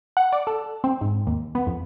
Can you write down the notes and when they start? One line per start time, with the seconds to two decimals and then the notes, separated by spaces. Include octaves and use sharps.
0.17 F#5
0.32 D5
0.47 A4
0.84 C4
1.01 G#2
1.27 D#2
1.55 B3
1.67 F2